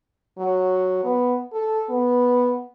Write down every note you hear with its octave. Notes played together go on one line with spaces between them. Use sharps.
F#3
B3
A4
B3